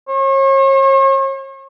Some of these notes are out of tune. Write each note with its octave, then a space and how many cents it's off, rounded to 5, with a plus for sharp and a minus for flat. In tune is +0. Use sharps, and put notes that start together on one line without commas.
C#5 -40